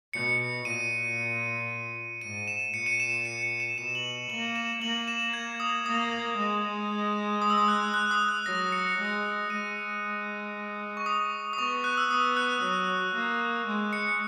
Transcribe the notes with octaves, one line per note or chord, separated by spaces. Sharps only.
B2 C#7
A#2 D#7
G#2 D#7
E7
A#2 C#7
D#7
E7
C#7
C#7
E7
B2 E7
F#7
A#3 F#7
E7
A#3 F#7
E7
G#6
D#6
A#3 D#6
G#3
D#6
E6
D#6
F#6
F#6
D#6
F#6
F#3 A#6
C#7
G#3
G#3 D#7
C#6
D#6
D#6
B3 C#6
F#6
E6
B3 D#6
F#6
F#3
A#3
G#3
C#7